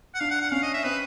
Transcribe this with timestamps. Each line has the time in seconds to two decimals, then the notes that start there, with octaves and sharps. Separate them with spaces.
0.14 F#5
0.20 D4 F5
0.30 F#5
0.41 F#5
0.52 C#4 F5
0.63 D#5
0.74 E5
0.84 C4 B4